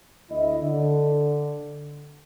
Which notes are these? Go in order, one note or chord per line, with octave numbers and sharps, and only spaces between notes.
D2 E4 D#5
D3